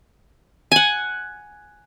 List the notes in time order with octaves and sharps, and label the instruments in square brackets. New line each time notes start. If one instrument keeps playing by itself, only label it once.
[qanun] F#5 G#5